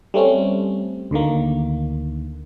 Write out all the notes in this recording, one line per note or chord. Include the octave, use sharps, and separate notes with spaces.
G3 A3 C4 C#4
D2 D3 D#3 A#3